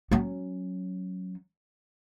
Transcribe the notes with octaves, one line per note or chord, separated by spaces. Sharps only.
F#3 C#4